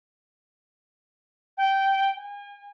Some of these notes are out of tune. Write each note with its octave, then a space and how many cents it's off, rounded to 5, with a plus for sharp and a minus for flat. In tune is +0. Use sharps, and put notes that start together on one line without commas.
G5 -15
G#5 -40